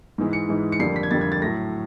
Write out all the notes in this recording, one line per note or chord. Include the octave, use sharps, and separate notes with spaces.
G#2 E3 G#3
C#7
G#2 E3 G#3
C#7
F2 D3 G3 A#3 C7
B6
G#6
F2 D3 G3 A#3 A6
G#6
A6
A2 F#3 A3 A#6